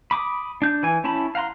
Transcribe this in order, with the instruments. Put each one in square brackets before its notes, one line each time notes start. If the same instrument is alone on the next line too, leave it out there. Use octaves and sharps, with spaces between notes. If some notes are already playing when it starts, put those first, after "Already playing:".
[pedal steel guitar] B5 D6 D#6
D4 G6
E3 G#5
C#4 E4 A5 B5
F5 F#5 A#5 C6